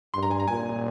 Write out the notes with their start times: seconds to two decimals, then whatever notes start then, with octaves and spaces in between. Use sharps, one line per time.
0.14 G2 C6
0.23 A#5
0.31 G#5
0.40 A#5
0.48 A#2 G#5